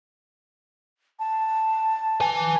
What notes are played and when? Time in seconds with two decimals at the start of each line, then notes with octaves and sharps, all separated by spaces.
1.19 A5
2.20 B4 G#5